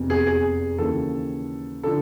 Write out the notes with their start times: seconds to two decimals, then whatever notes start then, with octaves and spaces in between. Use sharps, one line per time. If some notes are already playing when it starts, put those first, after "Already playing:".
Already playing: F1 E2 C3
0.10 G#4
0.27 G#4
0.78 D#2 C#3 E3 A4
1.83 D3 F3 A4